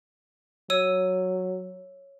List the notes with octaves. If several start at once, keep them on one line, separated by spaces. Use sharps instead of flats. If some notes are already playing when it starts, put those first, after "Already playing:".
F#3 C#5 E6 D#7